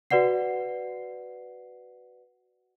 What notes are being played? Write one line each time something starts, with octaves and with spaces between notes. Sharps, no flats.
F#4 B4 D5 F#5 C7